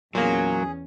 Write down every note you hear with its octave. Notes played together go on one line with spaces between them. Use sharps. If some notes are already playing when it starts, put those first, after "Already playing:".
E2 A#2 F#3 A#3 C#4 G#4